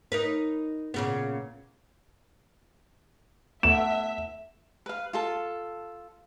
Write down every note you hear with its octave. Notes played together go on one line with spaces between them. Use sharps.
D#4 A#4 B4
A#2 C#3 B3
A3 B3 E5 E7
B4 F5
F4 A4 A5